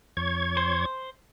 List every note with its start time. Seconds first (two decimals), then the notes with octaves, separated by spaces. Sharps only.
0.17 F2 C#5 G#6
0.57 C5